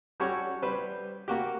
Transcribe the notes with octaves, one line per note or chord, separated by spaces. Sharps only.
G3 C#4 F#4 G4 A4 C#5
G3 B4 C5
A#3 F#4 G4